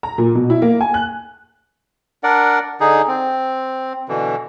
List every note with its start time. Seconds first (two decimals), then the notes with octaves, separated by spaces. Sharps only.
0.03 A#5
0.18 A#2
0.35 B2
0.50 E4
0.62 A#3
0.81 G#5
0.94 F#6
2.23 D4 A#4 D5 F#5
2.80 D3 D#4 G#4
3.07 C4
4.08 B2 D3 E3